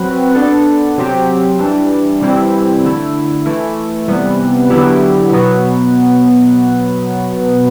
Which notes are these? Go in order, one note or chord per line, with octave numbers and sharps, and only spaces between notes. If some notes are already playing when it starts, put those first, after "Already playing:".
Already playing: F#3 C4 F#4 B4
B3 D4 A4
C3 F#3 C4 G4
E3 G3 D4
C3 E3 G3 C4 E4
D3 A3 E4
E3 A3 E4
C3 E3 G3 B3
D3 F#3 B3 E4 G4
B2 F#3 B3